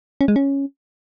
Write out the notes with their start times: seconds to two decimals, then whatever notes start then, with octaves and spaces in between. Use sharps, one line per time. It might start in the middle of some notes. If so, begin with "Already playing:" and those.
0.21 C#4
0.28 G#3
0.36 C#4